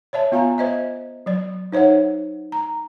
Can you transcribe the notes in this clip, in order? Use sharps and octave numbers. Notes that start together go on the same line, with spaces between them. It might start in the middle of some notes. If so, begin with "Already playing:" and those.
C#5 D5 E5 A5
B3 F4 F5 G#5 A#5
C5 D#5 E5
F#3 D5
D#4 C5 C#5 E5 F#5
A#5